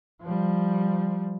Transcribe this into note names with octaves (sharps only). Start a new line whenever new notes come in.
F3 G3